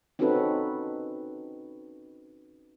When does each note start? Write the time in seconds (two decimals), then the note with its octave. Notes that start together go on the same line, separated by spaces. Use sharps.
0.19 C4 C#4 D#4 F#4 A4 B4